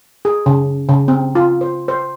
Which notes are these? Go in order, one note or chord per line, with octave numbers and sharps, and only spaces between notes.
G#4
C#3
C#3
C4
F4
C5
C5